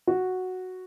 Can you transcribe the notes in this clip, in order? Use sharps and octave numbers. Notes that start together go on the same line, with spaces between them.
F#4